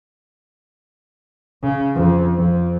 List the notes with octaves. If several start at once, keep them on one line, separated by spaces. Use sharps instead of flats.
C#3
F2
F2